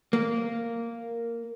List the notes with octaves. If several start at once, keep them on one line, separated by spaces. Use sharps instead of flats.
A#3